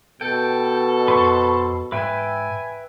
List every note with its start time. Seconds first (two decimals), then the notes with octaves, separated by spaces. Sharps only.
0.21 B2 A4 G5
1.08 F2 B4 C5 C#6
1.92 G#2 B4 E5 G5 G#5